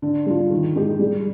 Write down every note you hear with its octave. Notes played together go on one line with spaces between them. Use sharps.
D3
G3 D4 F4
D#3
G#3 D#4 G4
G3